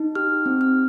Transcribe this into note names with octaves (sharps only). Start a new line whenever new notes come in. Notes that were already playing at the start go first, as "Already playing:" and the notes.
Already playing: D#4
G4 F6
C4
F6